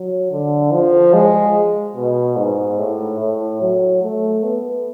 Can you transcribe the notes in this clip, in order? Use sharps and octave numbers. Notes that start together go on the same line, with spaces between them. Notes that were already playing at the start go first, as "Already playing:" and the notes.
Already playing: F#3
D3
F3
G#3
B2
G#2
A2
A2
F#3
A3
B3